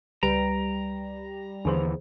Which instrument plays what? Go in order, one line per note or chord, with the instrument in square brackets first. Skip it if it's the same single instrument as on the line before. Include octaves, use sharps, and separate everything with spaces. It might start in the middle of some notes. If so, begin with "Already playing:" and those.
[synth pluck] C#2 B4 D7 [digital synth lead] G3 [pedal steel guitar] A#5
[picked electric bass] D#2 E3 [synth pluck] D3 G#4 C5